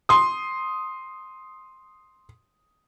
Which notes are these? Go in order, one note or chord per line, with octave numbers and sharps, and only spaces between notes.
C6 D#6